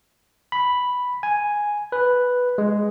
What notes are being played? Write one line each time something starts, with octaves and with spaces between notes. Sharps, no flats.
B5
G#5
B4
G#3